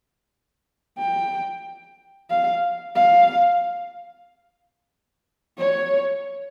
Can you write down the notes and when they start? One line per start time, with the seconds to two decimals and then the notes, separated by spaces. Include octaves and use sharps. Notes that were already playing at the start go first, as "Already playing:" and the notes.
0.99 G5
2.30 F5
2.95 F5
5.58 C#5